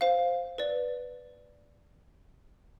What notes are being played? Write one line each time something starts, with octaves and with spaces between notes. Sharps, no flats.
C5 F5
B4 D5